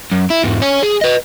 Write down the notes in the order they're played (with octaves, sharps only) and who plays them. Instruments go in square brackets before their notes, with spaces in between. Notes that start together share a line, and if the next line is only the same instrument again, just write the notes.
[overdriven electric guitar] F#2
E4
E2 G#2
C#5 G#5
G#4
B4 D#5